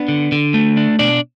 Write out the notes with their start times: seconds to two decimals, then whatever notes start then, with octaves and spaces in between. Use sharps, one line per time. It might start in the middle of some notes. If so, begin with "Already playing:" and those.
Already playing: B3 D4
0.08 D3
0.32 D3
0.54 A3
0.77 D4
0.99 B2 D4 D5